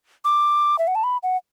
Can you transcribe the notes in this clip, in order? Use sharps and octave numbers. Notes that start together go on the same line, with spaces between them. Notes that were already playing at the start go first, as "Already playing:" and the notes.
D6
E5
F#5
A5
B5
F#5